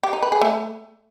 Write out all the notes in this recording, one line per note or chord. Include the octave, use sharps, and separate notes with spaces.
G4
D#4
B4
G#4
A3